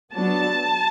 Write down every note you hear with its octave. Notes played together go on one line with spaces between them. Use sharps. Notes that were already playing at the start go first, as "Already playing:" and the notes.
F#3 B3 D4 A5